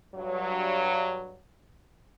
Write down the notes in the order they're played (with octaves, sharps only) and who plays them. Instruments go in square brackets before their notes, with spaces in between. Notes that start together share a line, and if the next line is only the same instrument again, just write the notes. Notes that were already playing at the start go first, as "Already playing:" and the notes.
[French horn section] G2 F#3